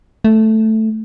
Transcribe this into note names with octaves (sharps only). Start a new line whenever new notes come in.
A3